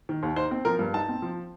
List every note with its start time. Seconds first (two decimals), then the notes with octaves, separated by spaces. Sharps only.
0.09 D#3
0.23 D#2
0.36 D#4 C5
0.51 C4
0.65 F3 A#4
0.79 G2
0.94 D#4 A5
1.09 C4
1.22 F3